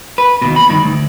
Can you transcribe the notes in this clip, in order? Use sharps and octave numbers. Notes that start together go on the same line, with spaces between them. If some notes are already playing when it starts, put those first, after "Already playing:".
B4
D#2 B2
B5
G2 D#3
D2